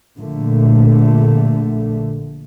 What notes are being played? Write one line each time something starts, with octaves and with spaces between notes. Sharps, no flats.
A#1 A#2 D3 A3